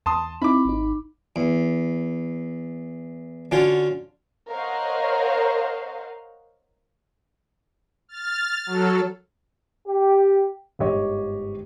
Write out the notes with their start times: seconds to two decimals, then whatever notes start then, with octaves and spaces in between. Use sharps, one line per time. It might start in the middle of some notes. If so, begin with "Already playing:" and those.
0.06 E2 A5 C6 D#6
0.42 C4 D#4 E4 B5 D6
0.65 G#1 D#4
1.36 E2
3.52 D3 C#4 F4 F#4
4.49 A#4 C5 C#5 D#5 F5 F#5
8.09 F6 A6
8.66 F#3 A4
9.87 G4
10.79 G1 G#2 G4 C#5 D#5